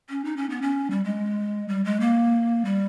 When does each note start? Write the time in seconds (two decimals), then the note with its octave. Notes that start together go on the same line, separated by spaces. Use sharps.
0.09 C#4
0.25 D#4
0.37 C#4
0.50 B3
0.62 C#4
0.91 G3
1.04 G#3
1.69 G3
1.85 G#3
2.00 A#3
2.65 G3